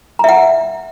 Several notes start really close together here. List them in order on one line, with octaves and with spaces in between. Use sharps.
A#5 E5 F#5